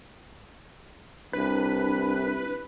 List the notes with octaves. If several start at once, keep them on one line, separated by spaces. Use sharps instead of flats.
C2 D4 B4